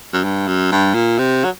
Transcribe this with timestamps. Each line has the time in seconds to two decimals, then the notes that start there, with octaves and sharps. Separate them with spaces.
0.13 F#2
0.24 G2
0.48 F#2
0.72 G2
0.94 A#2
1.18 C3
1.44 F#3